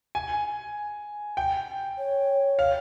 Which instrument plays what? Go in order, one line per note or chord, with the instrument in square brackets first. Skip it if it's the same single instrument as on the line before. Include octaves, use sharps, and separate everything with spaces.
[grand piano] G#5
G5
[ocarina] C#5
[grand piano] F5